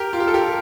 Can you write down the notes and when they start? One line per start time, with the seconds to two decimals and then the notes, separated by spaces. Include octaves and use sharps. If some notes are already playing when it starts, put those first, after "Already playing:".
Already playing: G4 A#4
0.13 F4
0.20 G4
0.28 A4
0.34 G4 A#4